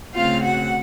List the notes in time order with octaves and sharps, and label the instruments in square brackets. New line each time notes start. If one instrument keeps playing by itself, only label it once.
[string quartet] C#3 A3 C4 F4 F5
F#4 F#5